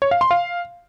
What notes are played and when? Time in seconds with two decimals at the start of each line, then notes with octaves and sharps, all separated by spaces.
0.02 C#5
0.11 F5
0.21 C6
0.31 F5